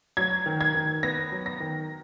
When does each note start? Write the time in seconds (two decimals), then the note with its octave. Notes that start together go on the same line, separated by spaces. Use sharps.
0.17 F#3 G#6
0.46 D#3
0.61 G#6
0.74 D#3
1.03 B3 A#6
1.32 F#3
1.46 A#6
1.60 D#3